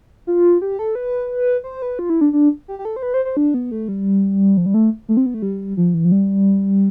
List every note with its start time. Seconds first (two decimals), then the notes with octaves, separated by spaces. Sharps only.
0.27 F4
0.62 G4
0.79 A4
0.95 B4
1.64 C5
1.82 B4
1.99 F4
2.10 E4
2.21 D4
2.33 D4
2.68 G4
2.79 G4
2.85 A4
2.96 C5
3.03 B4
3.14 C5
3.25 C5
3.37 D4
3.54 B3
3.71 A3
3.88 G3
4.57 F3
4.66 G3
4.74 A3
5.09 A3
5.17 C4
5.26 B3
5.34 A3
5.42 G3
5.77 F3
5.94 E3
6.05 F3
6.12 G3